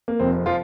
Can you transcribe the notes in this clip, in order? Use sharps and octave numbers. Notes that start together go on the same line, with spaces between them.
A#3
F1 F2 C3 F3 C4
F3 F4